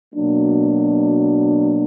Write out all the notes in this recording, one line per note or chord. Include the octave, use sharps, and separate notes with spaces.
B2 F#3 A#3 D4